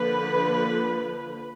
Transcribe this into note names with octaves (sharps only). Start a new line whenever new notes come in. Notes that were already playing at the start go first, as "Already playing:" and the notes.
Already playing: D3 F3 A#3 B4